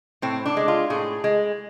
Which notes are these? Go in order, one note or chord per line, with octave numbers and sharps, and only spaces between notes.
A2 C4
D4
G#3
F4
A2 G#4
G#3